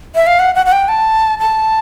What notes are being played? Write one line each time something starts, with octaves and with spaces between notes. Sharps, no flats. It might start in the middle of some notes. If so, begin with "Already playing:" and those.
E5
F5
F#5
F#5
F#5
G5
A5
A5